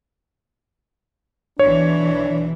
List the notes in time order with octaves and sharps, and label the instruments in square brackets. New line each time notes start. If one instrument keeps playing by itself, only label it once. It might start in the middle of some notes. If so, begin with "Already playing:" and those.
[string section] B1 E3 [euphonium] D4 [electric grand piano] C#5